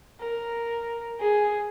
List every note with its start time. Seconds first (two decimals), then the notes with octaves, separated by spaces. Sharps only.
0.20 A#4
1.20 G#4